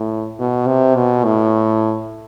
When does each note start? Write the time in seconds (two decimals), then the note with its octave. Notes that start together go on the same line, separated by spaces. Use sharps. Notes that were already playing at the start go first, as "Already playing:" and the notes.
Already playing: A2
0.40 B2
0.67 C3
0.96 B2
1.24 A2